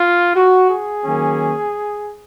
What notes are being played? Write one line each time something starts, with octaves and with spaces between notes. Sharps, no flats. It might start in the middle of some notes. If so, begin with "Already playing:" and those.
Already playing: F4
F#4
G#4
D#3 F#3 A#3 C#4